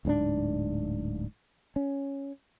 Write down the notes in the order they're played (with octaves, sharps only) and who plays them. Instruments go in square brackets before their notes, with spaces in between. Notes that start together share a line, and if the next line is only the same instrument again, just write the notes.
[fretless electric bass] D1 G#2 C#4 D4
C#4